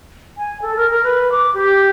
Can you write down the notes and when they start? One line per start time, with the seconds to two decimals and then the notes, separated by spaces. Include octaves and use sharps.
0.37 G#5
0.62 A4
0.77 A#4
0.90 A#4
1.03 B4
1.32 D6
1.54 G4